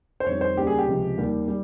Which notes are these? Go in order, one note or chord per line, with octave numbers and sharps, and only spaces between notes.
C5
F2 D#3 G3 C#5
C5
D#2 C#3 G3 G4
G#4
G4
C#2 C3 F3 G#3
D#2 D#3 G3
G3